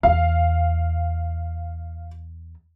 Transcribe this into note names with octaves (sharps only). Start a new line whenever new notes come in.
E2 F5